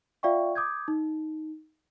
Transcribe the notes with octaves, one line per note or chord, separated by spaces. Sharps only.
F4 D5 E5 F5 G5 C#6
D6 D#6 G6 G#6
D#4